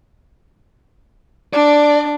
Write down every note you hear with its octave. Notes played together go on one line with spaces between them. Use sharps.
D4 D5